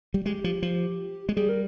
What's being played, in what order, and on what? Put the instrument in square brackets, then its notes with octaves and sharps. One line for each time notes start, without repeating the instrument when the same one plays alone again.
[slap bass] G3
[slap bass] G#3 [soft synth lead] G4
[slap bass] F3
F3
G#3
[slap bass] G3 [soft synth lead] G#4
[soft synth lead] A#4